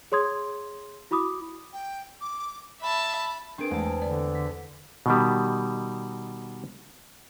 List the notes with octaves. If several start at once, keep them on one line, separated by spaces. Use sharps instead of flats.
G#4 C#5 C6 D#6 G#6
E4 F#4 B5 D6 D#6
G5
D6
E5 A5 B5
C4 D4 G#4 A#4 B4 D7
E2 E3 G#3 A3 A5
D3 D5
B6
B2 D#3 G3